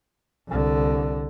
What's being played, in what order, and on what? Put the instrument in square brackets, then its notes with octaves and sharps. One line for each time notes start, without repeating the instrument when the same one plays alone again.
[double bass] C2 D3